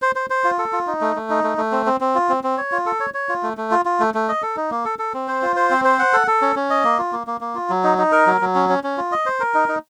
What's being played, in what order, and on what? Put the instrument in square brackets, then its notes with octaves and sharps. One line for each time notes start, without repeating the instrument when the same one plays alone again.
[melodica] C5
C5
C5
F4
A4
F4
D#4
A3
A3
D#4
A3
A3
C4
C4
C4
F4
C4
C4
C#5
F4
A4
C#5
C#5
F4
A3
A3
F4
F4
A3
A3
D#5
A4
D#4
A#3
A4
A4
C4
C5
F4
C5
C4
C5
F#5
A4
A4
C#4
C#4
D#5
A#3
F4
A#3
A#3
A#3
F4
F#3
D#4
D#4
A#4
F#3
F#3
C#4
C#4
C#4
F4
D#5
C5
A#4
D#4
D#4